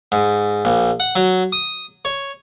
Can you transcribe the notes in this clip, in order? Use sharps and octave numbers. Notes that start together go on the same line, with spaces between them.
G#2
A#1
F#5
F#3
D#6
C#5